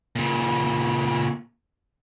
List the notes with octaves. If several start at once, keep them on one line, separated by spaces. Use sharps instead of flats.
A#2 C#3